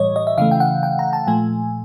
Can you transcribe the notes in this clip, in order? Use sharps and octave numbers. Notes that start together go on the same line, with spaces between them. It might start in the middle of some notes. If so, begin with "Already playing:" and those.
Already playing: A2 E3 G3 C#5 D#5
D#5
E5
C#3 E3 A3 F5
G5
F#5
G5
A#5
A5
A#2 F3 A3 G#5